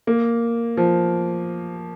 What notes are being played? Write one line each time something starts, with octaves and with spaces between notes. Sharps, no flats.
A#3
F3